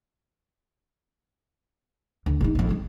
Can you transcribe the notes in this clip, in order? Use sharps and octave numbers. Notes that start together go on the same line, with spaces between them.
D2
A#1 D#4
A#1 F2
F3 G3